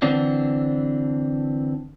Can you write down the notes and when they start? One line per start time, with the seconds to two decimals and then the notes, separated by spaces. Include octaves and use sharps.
0.02 D3 E3 C4 D4